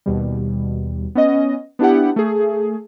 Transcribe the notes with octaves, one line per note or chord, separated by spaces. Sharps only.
D#2 B2 G3
B3 C#4 D#5
B3 D4 E4 G4 F#5
A3 G#4